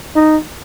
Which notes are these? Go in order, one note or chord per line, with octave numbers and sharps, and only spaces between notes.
D#4